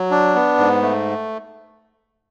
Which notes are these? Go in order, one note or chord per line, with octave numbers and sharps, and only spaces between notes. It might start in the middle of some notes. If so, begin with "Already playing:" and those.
Already playing: F#3
D4
B3
G#2
A3